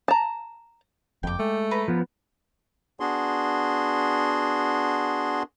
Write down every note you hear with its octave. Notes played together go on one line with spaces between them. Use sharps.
A5 A#5
F#1 F2 G5 D6
G#3 A3
B4 A#5
F3 B3
B3 D4 F#4 G#4 C6